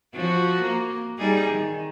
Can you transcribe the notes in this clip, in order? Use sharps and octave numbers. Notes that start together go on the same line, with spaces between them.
F3 F#4
A#3
G3 D#4 G#4
D#3